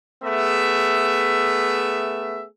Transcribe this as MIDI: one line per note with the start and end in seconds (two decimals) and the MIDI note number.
0.24 2.44 57
0.24 2.44 59
0.24 2.44 68
0.24 2.44 76